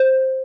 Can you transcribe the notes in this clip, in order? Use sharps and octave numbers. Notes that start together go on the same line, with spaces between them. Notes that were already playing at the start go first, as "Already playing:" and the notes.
Already playing: C5